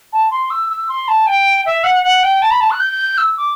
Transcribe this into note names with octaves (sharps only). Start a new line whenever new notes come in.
A5
C6
E6
E6
C6
A5
G5
E5
F#5
F#5
G5
A5
B5
A5
F#6
G6
E6
D6